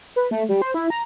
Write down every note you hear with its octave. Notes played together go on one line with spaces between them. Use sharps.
B4
A3
G3
C5
E4
A#5